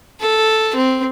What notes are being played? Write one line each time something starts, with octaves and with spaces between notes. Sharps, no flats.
A4
C4